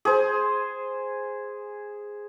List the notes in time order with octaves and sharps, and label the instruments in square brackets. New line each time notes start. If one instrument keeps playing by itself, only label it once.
[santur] G#4 C5